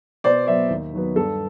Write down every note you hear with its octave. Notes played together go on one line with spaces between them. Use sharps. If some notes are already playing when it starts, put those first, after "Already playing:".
B2 C5 D5
F#3 B3 D5 E5
D#2
D#3 F#3 B3
G2 A4